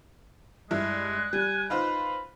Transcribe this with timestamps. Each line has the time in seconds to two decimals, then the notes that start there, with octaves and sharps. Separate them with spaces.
0.71 G2 G#3 E4 F#6
1.33 G3 G#5
1.70 D#4 F4 B4 C5